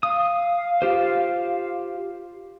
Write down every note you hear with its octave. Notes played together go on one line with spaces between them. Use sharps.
F5 D#6
F4 G4 C5